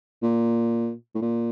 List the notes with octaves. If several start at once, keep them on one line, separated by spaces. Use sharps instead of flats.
A#2
A2
A#2